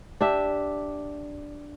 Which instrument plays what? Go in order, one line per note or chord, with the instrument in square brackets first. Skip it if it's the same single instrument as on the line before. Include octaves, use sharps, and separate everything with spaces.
[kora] D4 G4 E5